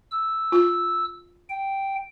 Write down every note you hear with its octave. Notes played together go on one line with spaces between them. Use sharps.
E6
F4
G5